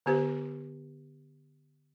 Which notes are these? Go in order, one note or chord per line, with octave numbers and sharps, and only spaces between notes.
D3 B3 G4 C5